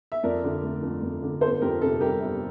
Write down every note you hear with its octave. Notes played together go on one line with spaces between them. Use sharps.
E5
F2 A#4 D5
D3
A3
F2
F2
D3
G1 A4 C5
F2 G4 A#4
C3 A4
G3 G4 A#4
G1